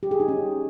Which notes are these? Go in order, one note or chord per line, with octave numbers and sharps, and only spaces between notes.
G4
G#4
D#4
C#4